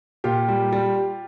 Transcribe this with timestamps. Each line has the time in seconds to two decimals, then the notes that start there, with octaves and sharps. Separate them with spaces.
0.24 A#2 F4 G4
0.49 G3
0.72 G3